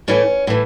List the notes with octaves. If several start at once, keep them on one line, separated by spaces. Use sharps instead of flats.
A2 E3 A3 C#4
A2 E3